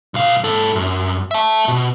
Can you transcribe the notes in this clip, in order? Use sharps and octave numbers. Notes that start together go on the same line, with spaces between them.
B1 F5
G#2 A4
F#2
E5 A5
B2